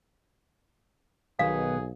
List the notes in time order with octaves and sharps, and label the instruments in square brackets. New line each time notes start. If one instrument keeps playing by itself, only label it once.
[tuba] B1 [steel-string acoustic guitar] B2 D#3 B3 [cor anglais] G#4 [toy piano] F5